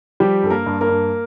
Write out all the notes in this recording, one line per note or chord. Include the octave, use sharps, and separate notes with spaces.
F3 G3 G4
G2 A4
A#3 A#4
G2
A#3 A#4
G2